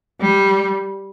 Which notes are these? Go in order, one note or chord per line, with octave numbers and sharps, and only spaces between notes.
G3